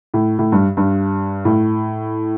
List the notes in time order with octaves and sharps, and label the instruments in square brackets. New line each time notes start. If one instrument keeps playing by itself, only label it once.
[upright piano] A2
A2
G2
G2
A2